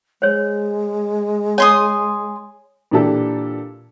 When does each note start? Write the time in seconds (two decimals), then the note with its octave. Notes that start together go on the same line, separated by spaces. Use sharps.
0.22 G#3 C5 C#5
1.58 C#5 G#5 C6 D#6
2.91 A#2 E3 D4 G4 A4